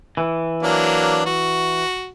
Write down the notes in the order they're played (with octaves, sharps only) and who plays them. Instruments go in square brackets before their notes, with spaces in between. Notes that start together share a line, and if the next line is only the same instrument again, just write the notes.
[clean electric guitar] E3
[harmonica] F#3 A#3 D4
F#4